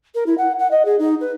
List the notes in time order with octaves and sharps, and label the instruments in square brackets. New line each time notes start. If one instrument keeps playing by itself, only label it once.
[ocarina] A#4
E4
F#5
F#5
D#5
G#4
D#4
B4